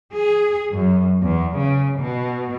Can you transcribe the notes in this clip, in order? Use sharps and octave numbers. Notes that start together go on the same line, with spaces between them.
G#4
F#2
E2
C#3
B2